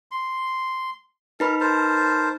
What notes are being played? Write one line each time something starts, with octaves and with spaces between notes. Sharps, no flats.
C6
D#4 A#4 B4 B5
A#4 C5 A5